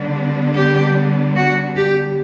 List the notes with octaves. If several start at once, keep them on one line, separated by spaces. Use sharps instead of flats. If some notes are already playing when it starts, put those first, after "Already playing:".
Already playing: D3 G3 B3 D4
G4
F#4
G4